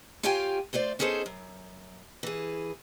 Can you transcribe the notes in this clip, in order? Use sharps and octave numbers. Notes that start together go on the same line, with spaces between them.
C#4 F4 G4 F5 G5 G#5
A3 F4 C5 D5
B3 C#4 D#4 G#4 A4 C5
F#2
E3 G#4